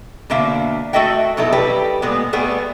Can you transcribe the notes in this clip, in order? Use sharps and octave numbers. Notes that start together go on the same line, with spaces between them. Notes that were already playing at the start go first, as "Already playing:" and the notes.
B2 D3 A#3 E5 F5
A3 F#4 A4 D#5 E5 G5
B2 F#3 D#4 E4 A4
G3 G4 A4 B4
A#2 G#3 B3
G3 A3 B3 G#4